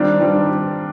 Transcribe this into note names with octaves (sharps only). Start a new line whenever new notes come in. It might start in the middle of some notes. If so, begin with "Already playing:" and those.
Already playing: D#3 G3 C4 D4 F4
D#3 G3 C4 F4